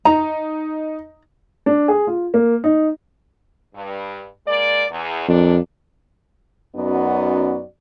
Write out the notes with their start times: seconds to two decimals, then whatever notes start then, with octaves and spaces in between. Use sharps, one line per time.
0.05 D#4 A#5
1.66 D4
1.88 G#4
2.07 F4
2.34 A#3
2.64 D#4
3.74 G2
4.46 G#3 A#3 D5
4.90 E2
5.29 F2 A#2 D4
6.75 F#2 B3 C#4 D#4 F#4 D5